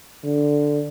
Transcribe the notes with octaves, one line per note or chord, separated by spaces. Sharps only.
D3